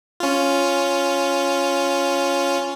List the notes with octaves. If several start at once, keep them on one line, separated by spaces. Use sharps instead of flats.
C#4 F4